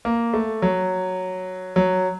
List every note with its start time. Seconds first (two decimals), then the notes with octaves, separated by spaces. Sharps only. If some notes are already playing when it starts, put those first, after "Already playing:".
0.05 A#3
0.34 A3
0.62 F#3
1.76 F#3